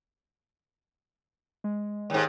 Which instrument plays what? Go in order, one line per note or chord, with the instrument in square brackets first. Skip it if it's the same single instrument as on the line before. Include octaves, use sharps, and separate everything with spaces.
[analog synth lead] G#3
[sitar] D#2 G#2